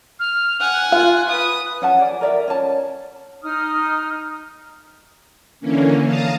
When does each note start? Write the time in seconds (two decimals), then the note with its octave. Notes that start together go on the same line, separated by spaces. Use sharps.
0.20 F6
0.60 F#5 G#5 F#6
0.92 F4 F5
1.29 B4 D#6
1.82 C#4 F#5 A5
1.99 G#4 D5
2.21 A#4 D5 E5
2.48 C#4 A5
3.43 D#4 D#6 F6
5.60 D3 E3 A#3 C#4
6.04 F5 A5 A#5 D#6